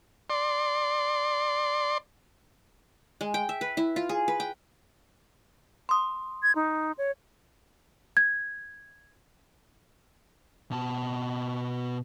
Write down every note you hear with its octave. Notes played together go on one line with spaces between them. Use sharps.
D5 C6
G#3
G5
E5
B4
E4
F4
G#4
B4
G5
C6 D#6
G#6
D#4
C#5
G#6
B2 A5